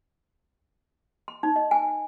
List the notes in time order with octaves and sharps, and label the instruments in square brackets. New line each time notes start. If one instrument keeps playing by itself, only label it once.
[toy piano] C6
D#4
D#5
G#5